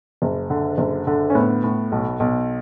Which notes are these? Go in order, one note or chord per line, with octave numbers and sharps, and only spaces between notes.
F#1
D3
F#1
D3
C#4
A2 B3
A2
B1
B1